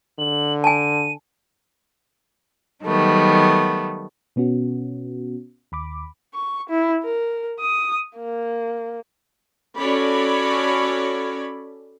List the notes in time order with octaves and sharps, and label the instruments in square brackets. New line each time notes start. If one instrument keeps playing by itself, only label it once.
[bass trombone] D3 [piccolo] F#7
[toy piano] G#5 A5 [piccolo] D#7
[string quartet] D#3 F#3 G3 A3 B3
[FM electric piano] B2 B3 C#4 F#4
D#2 B5 D6
[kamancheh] C#6
E4
A#4
D#6
A#3
[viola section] C#4 F#4 A4 C#5 D5 B5